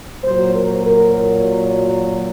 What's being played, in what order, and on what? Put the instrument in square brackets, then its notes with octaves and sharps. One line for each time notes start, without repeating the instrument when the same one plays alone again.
[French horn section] A#2 F#3 C5
A#4
A#4